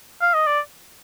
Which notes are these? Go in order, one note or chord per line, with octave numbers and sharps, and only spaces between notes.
F5
D#5
D5